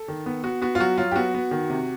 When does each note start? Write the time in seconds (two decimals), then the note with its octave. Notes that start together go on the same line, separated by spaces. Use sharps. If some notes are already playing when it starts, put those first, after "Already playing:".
Already playing: A4
0.08 D#3
0.26 B3
0.44 B3 F#4
0.61 B3 F#4
0.75 F4
0.80 F#3 F#4
0.98 F#3 F4
1.12 G4
1.16 B3 F#4
1.34 B3
1.51 D#3
1.70 C3